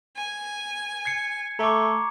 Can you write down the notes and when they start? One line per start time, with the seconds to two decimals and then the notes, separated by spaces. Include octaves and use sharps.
0.16 G#5
1.05 G#6 C7 C#7
1.59 A3 A#5 C#6 D6